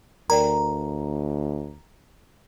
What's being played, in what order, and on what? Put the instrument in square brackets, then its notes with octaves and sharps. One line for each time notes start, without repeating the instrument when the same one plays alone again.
[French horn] D2 [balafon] A#4 D5 G5 [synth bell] A#5